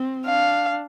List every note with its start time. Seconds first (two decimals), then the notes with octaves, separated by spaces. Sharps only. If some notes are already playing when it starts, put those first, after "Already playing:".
Already playing: C4
0.26 D4 F5